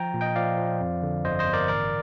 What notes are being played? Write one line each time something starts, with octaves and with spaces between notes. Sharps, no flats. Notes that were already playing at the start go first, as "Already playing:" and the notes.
Already playing: F3 G5 A#5
A#2
D#5 G5
F3 D5 F5
F3
F2
D3
G1 C5 D#5
C5 D#5
G1
A#4 D5
A1 A#4 D5